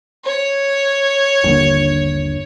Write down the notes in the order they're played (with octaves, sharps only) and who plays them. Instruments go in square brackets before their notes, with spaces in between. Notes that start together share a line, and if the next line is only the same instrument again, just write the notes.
[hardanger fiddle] C#5
[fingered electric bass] G1 D#2 D3